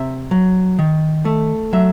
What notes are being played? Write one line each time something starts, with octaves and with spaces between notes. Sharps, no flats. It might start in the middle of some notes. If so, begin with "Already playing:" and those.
Already playing: C3 E5
F#3
D#3
A3
F#3 E5